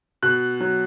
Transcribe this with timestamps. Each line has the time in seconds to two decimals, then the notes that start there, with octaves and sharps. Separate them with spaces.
0.23 B2 F#6
0.60 F#3